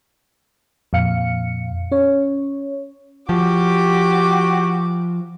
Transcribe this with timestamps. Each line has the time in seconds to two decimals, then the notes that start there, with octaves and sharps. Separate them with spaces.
0.93 F2 A#2 F5 C#7
1.92 C#4 C#5
3.29 F3 F#4 G4 D6